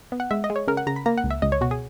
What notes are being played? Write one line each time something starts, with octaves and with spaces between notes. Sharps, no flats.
B3
F#5
G#3 E5
D#5
G#3
C#5
C#3 A#4
F#5
C#3 A#5
B5
A#3 A#5
F#5
C#2
E5
C#2 D#5
C#5
B2 F#4
G#4